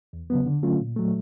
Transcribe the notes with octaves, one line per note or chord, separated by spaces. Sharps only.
E2
C#3 F#3 B3
D3
F#3 A3 C#4 F4
A#2
F#3 A3